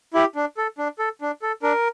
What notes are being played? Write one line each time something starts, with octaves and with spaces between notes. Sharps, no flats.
E4 G4
D4
A4
D4
A4
D4
A4
D4 A#4